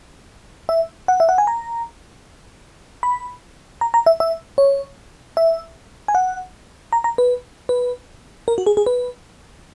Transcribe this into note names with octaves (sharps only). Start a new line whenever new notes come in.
E5
F#5
E5
F#5
G#5
A#5
B5
A#5
A#5
E5
E5
C#5
E5
G#5
F#5
A#5
A#5
B4
B4
A#4
F#4
G#4
G#4
B4